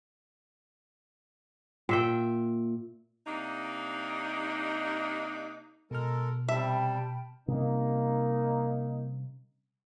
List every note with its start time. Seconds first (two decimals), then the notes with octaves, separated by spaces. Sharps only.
1.89 A#2 E5 G5
3.27 C3 A#3 D4 D#4
5.91 B2 G#3 A4 A#4 F6
6.49 C3 G3 E5 G5 A5 B5
7.48 C3 G3 A#3 C#4 D#4